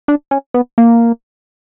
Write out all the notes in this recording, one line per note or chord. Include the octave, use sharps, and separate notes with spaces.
D4
C#4
B3
A#3